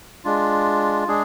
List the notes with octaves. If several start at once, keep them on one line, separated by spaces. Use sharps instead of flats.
G#3 D4 F4
G#3 D4 G#4